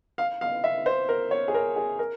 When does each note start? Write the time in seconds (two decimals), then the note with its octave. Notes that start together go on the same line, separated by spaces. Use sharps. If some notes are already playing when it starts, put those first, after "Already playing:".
0.18 F5
0.41 F5
0.64 E5
0.86 C5
1.09 A#4
1.31 C#5
1.48 G#4
1.54 A#4
1.76 G#4
1.99 A#4